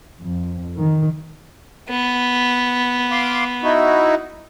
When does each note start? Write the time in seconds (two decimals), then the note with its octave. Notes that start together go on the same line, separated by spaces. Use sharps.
0.20 F2
0.78 D#3
1.90 B3
3.12 F5 C6 D6
3.63 D#4 E4 F#4